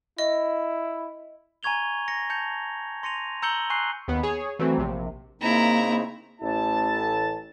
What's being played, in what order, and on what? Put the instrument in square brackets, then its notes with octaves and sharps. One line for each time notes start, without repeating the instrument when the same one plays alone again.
[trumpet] E4 [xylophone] D#5
[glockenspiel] G#5 A#5 C#6 G#6 F7 G7
A#6 C#7
A5 G6 C#7 F7
C6 A#6 C#7 D#7 F7
A#5 E6 G6 C#7 F#7 G7
G#5 C6 C#6 F#6 C7 G7
[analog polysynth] D#2 B3
G#4 C#5
E3 F#3 A3 C4
A#1 C3
[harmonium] C#3 C4 D#4 [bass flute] A#3 [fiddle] E4 A#5
[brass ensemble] A1 E4 A5